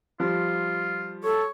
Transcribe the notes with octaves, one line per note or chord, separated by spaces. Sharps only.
F3 G3 F4
A4 C#5